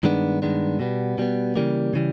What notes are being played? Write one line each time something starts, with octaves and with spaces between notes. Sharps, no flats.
G2 D#3 G#3 B3 D4
G2 D#3 G#3 B3 D4
B2 G3 B3
B2 G3 B3
C#3 E3 G3 A#3
C#3 E3 G3